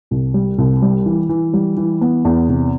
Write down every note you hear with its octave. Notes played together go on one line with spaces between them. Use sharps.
C2
G3
C2
G3
E3
E3
G3
E3
B3
E2
C3